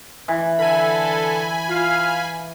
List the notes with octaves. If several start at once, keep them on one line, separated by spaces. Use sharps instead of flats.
E3
D3 A4 G#5 B5
F4 F5